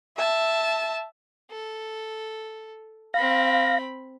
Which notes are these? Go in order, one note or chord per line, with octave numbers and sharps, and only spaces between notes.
E5 A5
A4
C4 F5 B5 A#6